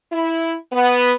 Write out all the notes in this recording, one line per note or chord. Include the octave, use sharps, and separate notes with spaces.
E4
B3